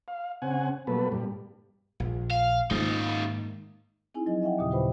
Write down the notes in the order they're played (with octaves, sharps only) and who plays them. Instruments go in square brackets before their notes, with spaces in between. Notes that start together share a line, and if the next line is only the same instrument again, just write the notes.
[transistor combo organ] F5
C#3 C4 F#5 G#5
B2 F#3 G3 A#3 A4 B4
G2 A#2 G3
[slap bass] A#1
[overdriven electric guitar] F5
[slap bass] G#2 D#3 A#3 [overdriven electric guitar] D#4 F4
[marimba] C4 D#4 E4 G#4 G#5
F3 F#3 D#5 G#5
D#5 E5 F#5 G5
D#2 A#2 C#3 G4 D#6
F4 G4 B4 C5 G5 B5